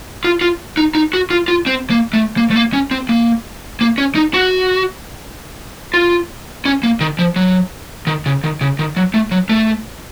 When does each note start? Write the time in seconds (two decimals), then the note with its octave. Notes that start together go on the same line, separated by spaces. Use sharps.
0.24 F4
0.41 F4
0.77 D#4
0.95 D#4
1.14 F#4
1.30 F4
1.48 F4
1.66 C4
1.90 A#3
2.13 A3
2.37 A#3
2.50 A3
2.56 A#3
2.73 C#4
2.91 C4
3.09 A#3
3.81 A#3
3.98 C#4
4.15 D#4
4.34 F#4
5.94 F4
6.65 C#4
6.83 A#3
7.01 D#3
7.19 F3
7.36 F#3
8.07 D#3
8.26 C#3
8.44 D#3
8.61 C#3
8.79 D#3
8.97 F#3
9.14 A3
9.32 F#3
9.49 A3